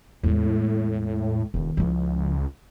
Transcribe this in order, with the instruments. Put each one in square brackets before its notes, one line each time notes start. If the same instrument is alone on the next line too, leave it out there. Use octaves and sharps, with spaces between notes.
[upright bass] E2 G#3 [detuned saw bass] A2
[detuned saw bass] E1 [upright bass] E2 D#3
[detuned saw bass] C#2 [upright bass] F3 E4